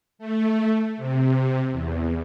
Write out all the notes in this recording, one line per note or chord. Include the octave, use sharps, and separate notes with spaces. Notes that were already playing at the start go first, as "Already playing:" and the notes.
A3
C3
E2